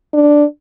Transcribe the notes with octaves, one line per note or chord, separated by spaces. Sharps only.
D4